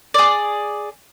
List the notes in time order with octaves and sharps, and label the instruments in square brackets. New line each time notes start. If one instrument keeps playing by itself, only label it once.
[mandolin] G#4 D5